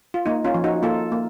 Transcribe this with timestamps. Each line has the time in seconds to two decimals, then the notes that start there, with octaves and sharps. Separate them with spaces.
0.14 F4
0.26 A#3 D#4
0.44 C#4 F4
0.54 F3
0.64 D#4 F#4
0.83 A#3 F4 A4
1.12 A#3